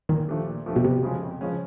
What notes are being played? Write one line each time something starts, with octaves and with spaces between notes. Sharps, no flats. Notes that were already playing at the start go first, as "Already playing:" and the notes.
A#2 D#3
F3 A3 D4 G4
A#2
F3 A3 D4 G4
B2
F2 C3
C#3 F3 G#3 C#4
F2
C#3 F3 G#3 C#4